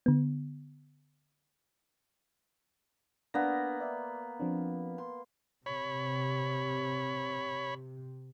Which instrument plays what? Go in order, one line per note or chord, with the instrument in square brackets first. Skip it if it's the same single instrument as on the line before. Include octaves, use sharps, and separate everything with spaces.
[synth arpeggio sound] D3 B3
[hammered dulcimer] A#3 B3 [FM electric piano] D4 A#6
[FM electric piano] D5 E5
F3 C4 D4
[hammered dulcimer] C6
[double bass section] C3 [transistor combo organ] C#5 B5